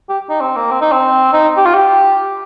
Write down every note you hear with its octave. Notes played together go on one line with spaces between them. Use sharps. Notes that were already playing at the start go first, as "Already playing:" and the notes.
G4
D#4
C4
A#3
C4
D#4
C4
D#4
G4
F4
G4